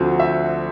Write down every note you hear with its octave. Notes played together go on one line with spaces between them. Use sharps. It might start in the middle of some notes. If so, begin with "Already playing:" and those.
Already playing: D2 D3 F3 C4
E5